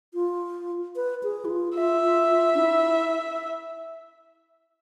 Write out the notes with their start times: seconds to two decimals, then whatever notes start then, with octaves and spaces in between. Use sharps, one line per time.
0.14 F4
0.96 B4
1.23 G#4
1.45 E4
1.50 F4
1.77 F4 E5
2.05 F4
2.31 F4
2.54 D4
2.59 E4